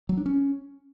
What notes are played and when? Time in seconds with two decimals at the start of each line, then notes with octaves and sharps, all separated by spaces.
0.09 F#3
0.17 D4
0.26 C#4